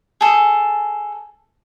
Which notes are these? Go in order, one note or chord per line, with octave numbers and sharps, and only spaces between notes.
G#4 A4